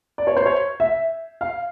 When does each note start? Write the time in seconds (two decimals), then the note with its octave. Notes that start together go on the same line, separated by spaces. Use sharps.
0.18 D5
0.27 C#5
0.37 C5
0.46 C#5
0.80 E5
1.41 F5